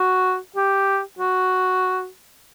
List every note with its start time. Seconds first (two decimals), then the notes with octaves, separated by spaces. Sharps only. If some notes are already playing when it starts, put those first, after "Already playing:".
Already playing: F#4
0.56 G4
1.19 F#4